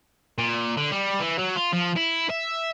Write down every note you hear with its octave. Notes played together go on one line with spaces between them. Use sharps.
A#2
D3
G3
E3
F#3
F4
F3
E4
E5